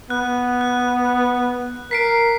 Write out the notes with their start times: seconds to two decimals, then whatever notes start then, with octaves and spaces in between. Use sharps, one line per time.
0.10 B3 F#6
0.61 F#6
1.91 A#4 B6 C7 D7